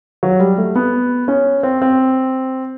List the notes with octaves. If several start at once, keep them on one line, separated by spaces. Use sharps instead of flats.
F#3
G3
A3
B3
C#4
C4
C4